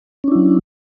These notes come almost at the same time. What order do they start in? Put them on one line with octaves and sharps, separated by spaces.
C#4 D4 E4 F#3